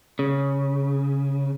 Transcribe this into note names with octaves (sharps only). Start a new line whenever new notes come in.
C#3